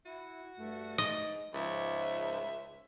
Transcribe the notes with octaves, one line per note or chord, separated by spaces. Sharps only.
E4 F#4
G2 A3
G#2 D#5
C#2 G#2 F3 G#3 E5